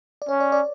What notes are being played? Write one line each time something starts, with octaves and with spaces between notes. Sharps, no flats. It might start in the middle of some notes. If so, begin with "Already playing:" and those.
D5
C#4 C#5
D5
D5